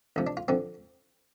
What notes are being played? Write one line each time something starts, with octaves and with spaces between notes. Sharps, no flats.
D2 C3 F3
D4
F4
D3 F3 C4